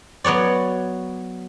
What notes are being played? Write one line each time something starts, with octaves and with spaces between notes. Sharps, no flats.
F#3 B3 C#5 D5